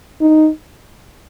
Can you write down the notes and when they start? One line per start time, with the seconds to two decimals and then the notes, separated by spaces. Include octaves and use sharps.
0.21 D#4